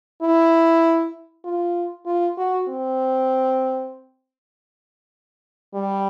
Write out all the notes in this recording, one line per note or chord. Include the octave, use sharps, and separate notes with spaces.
E4
F4
F4
F#4
C4
G3